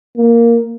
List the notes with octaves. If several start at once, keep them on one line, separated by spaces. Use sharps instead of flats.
A#3